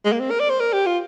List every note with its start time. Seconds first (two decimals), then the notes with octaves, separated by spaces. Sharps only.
0.05 G#3
0.12 A#3
0.20 C4
0.31 A#4
0.40 D5
0.50 C5
0.60 A#4
0.73 G4
0.86 F4